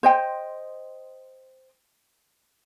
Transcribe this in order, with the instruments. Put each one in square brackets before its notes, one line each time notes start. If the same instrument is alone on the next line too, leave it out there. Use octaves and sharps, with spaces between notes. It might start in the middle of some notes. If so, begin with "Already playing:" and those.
[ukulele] C5 D#5 G5